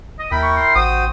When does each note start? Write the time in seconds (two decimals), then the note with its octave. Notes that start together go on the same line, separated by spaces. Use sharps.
0.19 D#5
0.31 D#2 E4 A#4 G5 B5
0.43 C#6
0.57 C6
0.75 A1 F#4 C5 G5 D#6